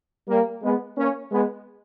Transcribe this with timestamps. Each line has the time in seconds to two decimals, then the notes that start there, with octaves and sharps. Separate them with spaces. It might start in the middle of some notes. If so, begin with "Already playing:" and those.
0.28 G3 A#3
0.62 G#3 B3
0.97 A#3 C#4
1.31 G#3 B3